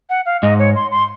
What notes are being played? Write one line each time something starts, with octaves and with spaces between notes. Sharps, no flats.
F#5
F5
G#2 D#5
C#5
C6
C6